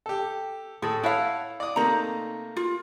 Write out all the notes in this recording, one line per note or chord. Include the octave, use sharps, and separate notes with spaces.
G4 A4
A2 G#4 A4
E4 C#5 F5 F#5 A5
D5 D#6
C3 A3 A#3 D#4 A#5
F4